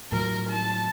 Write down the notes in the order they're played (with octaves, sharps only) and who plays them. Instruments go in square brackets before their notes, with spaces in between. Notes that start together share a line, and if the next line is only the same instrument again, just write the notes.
[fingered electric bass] A2 F3 F#3 [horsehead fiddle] A#4
[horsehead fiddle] A5